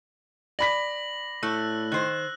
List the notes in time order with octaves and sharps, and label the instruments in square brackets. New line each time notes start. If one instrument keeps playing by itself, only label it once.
[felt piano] D5 B5 B6 [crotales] A#6 F#7
[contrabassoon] A2 [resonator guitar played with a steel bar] A3 [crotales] E6 F#6
[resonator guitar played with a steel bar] D#3 C5 [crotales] F#6